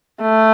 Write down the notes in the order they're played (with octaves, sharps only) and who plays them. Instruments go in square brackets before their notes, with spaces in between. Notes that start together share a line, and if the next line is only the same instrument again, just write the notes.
[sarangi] A3